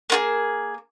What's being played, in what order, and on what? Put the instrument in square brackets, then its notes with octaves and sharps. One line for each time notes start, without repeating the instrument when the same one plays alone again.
[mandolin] A#3 F4 G#4